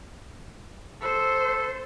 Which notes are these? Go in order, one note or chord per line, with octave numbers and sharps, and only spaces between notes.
A4 C5